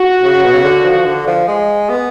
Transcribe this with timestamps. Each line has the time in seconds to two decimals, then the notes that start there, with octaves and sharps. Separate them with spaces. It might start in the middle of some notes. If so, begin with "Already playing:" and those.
Already playing: F#4
0.22 C#3
0.44 B2
0.53 C#3
0.64 D3
0.84 F3
1.05 D3
1.27 F3
1.47 G#3
1.89 B3